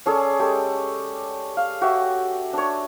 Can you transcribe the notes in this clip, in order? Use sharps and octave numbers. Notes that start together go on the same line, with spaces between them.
C#4 G#4 A4 D5
G#3 G4 A4
F5
F#4 G4 E5
D4 C#5